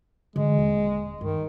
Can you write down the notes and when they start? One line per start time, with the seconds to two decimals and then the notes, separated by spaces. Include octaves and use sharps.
0.36 D3 E3 G#3
0.59 D#1
1.21 G2 D#3